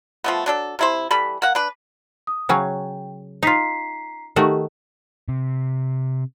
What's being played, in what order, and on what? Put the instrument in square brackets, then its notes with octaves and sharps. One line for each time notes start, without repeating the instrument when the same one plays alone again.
[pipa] F3 A3 B3
F#3 D4 A4
C3 E4 C5
E3 G3 A4 B5
A#3 F#5
D4 B4
[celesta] D#6
[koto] C#3 F#3 C#4 [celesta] G5
[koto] D#4 F4 [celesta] A#5 B6 C7
[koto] D#3 A3 F#4 [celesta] G4
[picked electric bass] C3